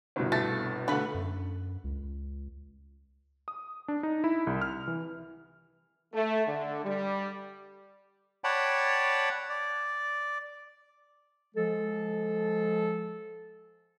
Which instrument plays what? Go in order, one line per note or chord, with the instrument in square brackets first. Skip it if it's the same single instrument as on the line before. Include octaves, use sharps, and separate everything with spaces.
[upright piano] G1 C2 B2
[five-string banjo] A3 [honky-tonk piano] A6
[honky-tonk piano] D3 A3 [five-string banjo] B4 B5
[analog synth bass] F#2
C#2
[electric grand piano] D#6
D4
D#4
E4
C2
F6
E3
[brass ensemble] A3
D3
G3
[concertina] C#5 D5 F#5 G5 A5 B5
D5
[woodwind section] F3 G#3 A4